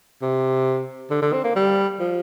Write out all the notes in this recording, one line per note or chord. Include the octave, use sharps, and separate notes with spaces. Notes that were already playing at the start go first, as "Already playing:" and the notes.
C3
D3
D3
C4
A#3
G3
F3